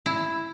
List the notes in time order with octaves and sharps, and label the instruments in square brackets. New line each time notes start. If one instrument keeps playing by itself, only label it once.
[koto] E4